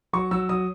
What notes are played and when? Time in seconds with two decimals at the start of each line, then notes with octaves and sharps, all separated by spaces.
0.13 F#3 C#6
0.31 F#3 E6
0.49 F#3 D#6